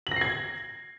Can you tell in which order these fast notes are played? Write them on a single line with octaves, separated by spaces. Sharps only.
F#7 A#6 C7 G#6